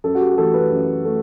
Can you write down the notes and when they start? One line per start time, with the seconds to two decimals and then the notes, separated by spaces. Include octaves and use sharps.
0.04 F#2 A4
0.15 F#4
0.21 G4
0.32 G4
0.38 E3 A3 A4
0.54 B4
0.71 F#2
1.05 A3